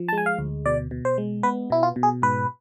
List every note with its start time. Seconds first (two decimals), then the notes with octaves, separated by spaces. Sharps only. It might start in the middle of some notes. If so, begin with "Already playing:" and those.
Already playing: F3
0.08 A5
0.13 G#3
0.18 G#5
0.26 F5
0.38 D2
0.66 B2 D5
0.91 B2
1.05 C5
1.18 G#3
1.43 B3 B4
1.70 B2 E4
1.83 F4
1.96 B2
2.03 G#4
2.22 G#2 B4